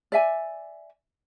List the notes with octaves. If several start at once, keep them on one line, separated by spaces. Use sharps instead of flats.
D5 E5 G#5